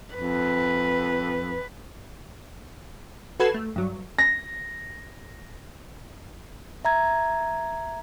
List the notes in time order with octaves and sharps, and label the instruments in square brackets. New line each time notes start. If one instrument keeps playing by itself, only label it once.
[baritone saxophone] F2 [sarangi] B4
[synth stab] F#4 A4 B4 G#6 C7 E7
A3
G2 F#3
[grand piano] A#6
[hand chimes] E5 A#5 G#6